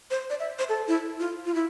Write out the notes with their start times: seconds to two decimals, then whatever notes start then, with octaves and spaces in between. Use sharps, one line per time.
0.11 C5
0.30 D5
0.40 E5
0.59 C5
0.69 A4
0.88 E4
1.20 F4
1.45 F4
1.54 E4